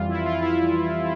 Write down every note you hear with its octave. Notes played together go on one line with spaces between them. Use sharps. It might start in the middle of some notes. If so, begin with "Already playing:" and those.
Already playing: F2 E3 G3 F4
E4
F4
E4